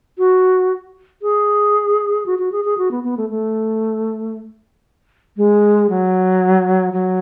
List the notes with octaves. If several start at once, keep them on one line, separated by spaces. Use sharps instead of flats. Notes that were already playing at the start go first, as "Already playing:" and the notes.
F#4
G#4
F#4
F#4
G#4
G#4
F#4
B3
B3
A3
A3
G#3
F#3
F#3